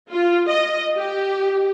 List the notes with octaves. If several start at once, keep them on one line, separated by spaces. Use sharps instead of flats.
F4
D#5
G4